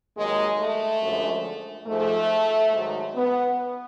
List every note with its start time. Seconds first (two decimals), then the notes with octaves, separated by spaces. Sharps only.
0.16 D#2 D#3 F#3 G#3
0.59 A3
1.02 F#2 D3 F3 G#3
1.87 G#2 F3 G#3 A3
2.72 G#2 D#3 F#3
3.15 B3